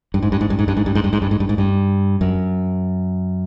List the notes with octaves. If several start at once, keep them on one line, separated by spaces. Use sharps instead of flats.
G2
G#2
G2
G#2
G2
G#2
G2
G#2
G2
G#2
G2
G#2
G2
G#2
G2
G#2
G2
F#2